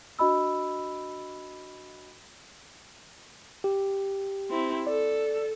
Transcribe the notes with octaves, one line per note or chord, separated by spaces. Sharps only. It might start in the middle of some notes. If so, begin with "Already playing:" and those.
D4 F#4 D#5 B5 E6
G4
C4 E4
A4 D5